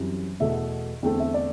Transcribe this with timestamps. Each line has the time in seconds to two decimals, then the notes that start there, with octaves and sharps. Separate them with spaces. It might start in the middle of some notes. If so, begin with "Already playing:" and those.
Already playing: F#2 E3 G3 C4
0.40 E2 B2 A3 E5
1.03 E2 D3 A3 C4 G5
1.20 E5
1.34 D5